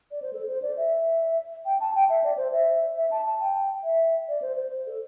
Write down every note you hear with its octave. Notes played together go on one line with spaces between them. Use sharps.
D5
C5
A4
C5
D5
E5
G5
A5
G5
E5
D5
C5
E5
E5
A5
A5
G5
E5
D5
C5
C5
A4